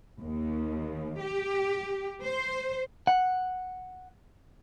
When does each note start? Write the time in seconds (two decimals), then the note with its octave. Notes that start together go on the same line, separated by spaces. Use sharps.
0.22 D#2
1.21 G4
2.22 C5
3.07 F#5